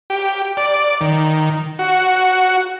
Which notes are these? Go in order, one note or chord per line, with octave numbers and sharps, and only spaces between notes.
G4
D5
D#3
F#4